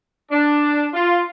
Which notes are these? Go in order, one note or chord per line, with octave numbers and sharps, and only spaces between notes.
D4
F4